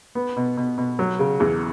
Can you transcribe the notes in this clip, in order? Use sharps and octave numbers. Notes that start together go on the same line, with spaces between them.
B3
B2
B2
B2
F#3
C#3
E2